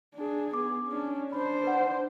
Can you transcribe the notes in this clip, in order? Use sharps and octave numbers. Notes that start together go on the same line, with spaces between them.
D4 G#4
B3 G#4 D6
C#4 D4
D4 C5 B5
B4 F#5